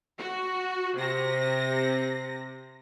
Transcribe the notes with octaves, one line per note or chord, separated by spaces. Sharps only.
F#4
C3 A#6